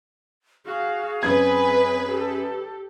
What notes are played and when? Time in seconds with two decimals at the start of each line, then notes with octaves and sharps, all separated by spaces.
0.65 F#4 G#4 F5
1.23 F#2 C4 B4 G#5 D#6 G#6
2.09 G4 A4